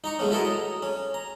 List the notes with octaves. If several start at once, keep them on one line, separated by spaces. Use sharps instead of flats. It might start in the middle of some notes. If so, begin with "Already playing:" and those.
D#4 A#5 C#6
G#3 A3 B3 C#4
E4 F#4 A4 A#4 D#5 A5
A#5
C#4
A#5